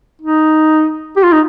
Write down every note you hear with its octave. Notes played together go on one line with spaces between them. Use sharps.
D#4
G4
F4
D#4